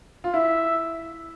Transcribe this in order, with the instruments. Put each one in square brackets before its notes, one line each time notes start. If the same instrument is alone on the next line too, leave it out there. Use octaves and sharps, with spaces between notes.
[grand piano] F4
[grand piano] E4 [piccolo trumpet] E5